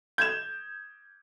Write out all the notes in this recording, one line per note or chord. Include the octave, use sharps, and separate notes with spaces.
G6 G#6 E7